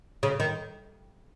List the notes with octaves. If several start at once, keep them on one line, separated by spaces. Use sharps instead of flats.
C#3
D#3